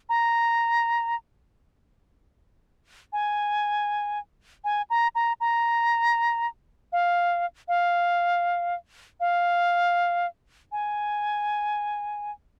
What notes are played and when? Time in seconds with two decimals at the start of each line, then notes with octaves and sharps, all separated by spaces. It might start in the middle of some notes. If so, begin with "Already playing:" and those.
0.09 A#5
3.13 G#5
4.64 G#5
4.90 A#5
5.15 A#5
5.40 A#5
6.92 F5
7.68 F5
9.20 F5
10.72 G#5